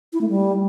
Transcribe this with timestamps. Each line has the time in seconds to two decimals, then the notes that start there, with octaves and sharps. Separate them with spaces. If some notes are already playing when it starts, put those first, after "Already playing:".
0.13 E4
0.21 A3
0.29 G3